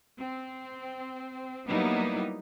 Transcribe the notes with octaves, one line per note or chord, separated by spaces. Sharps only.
C4
F#3 G3 A#3 B3 D#4 E4